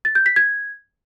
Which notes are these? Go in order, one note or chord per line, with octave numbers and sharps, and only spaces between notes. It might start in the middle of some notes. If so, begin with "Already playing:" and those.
A6
G6
B6
G#6